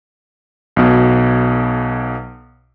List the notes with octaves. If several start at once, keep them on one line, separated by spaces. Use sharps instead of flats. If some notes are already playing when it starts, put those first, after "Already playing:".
B1 B2